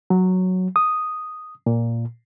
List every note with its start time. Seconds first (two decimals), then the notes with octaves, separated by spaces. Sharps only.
0.10 F#3
0.76 D#6
1.66 A#2